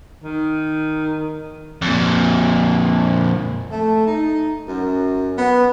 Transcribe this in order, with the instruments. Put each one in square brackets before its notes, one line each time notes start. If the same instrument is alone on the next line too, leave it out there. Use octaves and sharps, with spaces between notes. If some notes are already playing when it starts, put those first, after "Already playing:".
[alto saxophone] D#3
[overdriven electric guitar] F2 A#2
[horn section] A3
D#4
F#2
B3